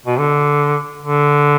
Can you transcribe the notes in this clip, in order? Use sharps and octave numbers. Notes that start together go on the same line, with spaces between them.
B2
D3
D3